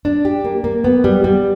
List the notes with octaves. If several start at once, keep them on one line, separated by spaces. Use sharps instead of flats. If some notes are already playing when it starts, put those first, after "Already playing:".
D4
G4
A#3
A#3
B3
G3
G3